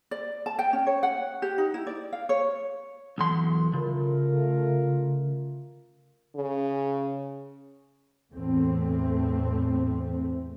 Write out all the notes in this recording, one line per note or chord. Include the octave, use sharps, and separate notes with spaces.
D5
A5
G5
C#4
C#5
F#5
G4
D#4
E4
D5
F5
C#5
B1 E2 C6
C#3 A3 F4 A#4
C#3
E2 A2 A3 C4